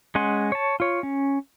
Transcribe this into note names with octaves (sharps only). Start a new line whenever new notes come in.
G#3 C#4 F#5 G#5 C6
C#5 A5
F4 C#5
C#4